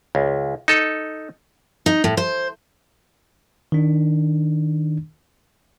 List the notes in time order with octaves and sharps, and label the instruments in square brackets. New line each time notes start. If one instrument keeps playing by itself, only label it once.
[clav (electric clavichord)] C#2
D#4 A4
[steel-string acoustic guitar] D#4
A2
C5
[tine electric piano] D#3 D4